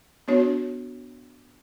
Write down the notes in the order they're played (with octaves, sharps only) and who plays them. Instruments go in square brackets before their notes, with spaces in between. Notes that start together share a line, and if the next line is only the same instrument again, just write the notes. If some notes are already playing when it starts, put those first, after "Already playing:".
[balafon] B3 D4 F#4 C#5